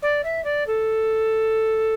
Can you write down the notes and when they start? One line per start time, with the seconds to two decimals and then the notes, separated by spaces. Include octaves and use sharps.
0.02 D5
0.24 E5
0.44 D5
0.67 A4